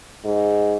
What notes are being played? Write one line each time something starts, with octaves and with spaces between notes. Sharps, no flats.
G#2